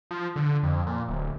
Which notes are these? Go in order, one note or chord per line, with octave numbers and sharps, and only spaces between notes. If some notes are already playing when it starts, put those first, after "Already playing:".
F3
D3
F2
A#2
D1